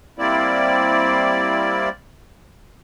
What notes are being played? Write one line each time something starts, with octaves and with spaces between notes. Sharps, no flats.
G3 A#3 C4 E4 D5